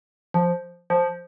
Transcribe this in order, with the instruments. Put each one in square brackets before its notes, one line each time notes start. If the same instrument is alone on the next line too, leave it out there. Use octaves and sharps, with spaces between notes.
[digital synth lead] F3
F3